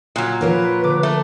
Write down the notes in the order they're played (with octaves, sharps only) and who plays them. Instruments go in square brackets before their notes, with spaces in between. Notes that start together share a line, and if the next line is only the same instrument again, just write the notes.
[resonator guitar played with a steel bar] A#2 F#3
[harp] F3 A#3 [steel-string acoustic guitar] F4 A#4 C#5 [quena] B4
[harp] D3 D6
[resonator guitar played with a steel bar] A3 [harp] A#5